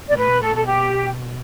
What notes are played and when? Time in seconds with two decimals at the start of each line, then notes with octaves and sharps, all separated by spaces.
0.08 B2 D5
0.17 A2 B4
0.29 B2
0.41 A2 A4
0.53 B2 A4
0.65 G4